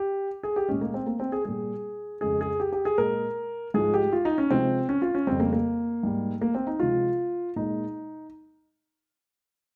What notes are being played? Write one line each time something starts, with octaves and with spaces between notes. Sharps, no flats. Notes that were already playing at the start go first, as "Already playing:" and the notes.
Already playing: G4
G#4
G4
A#2 G#3 C#4
A#3
C4
A#3
C4
G#4
A#2 G3 G#4
F2 C#3 G#3 G#4
G#4
G4
G4
G#4
A#2 G#3 A#4
G#2 F3 G#3 G#4
G4
F4
D#4
C#4
C3 F3 G#3 C4
C#4
F4
C#4
F2 C#3 G3 C4
A#3
A#3
G#2 G3
A#3
C4
D#4
C3 F3 G#3 F4
A#2 G#3 D#4